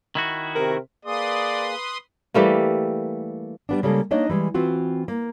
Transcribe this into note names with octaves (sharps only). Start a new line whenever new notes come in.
D#3 E4 F#4
C3 A#4
A#3 G#4 B4 D5 C6 D#6
E3 G3 A3 A#3
G3 B3 D4
C#3 G3 G#3 A#3 A4
A#3 D4 D#4 C#5 D#5
E3 G3 G#3
E3 C4 F4 F#4
A#3